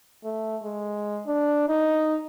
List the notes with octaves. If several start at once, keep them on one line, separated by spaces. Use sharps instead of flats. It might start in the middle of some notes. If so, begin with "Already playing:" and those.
A3
G#3
D4
D#4